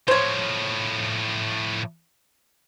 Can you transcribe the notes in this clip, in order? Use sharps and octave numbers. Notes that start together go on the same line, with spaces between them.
A2 F3 C5 C#5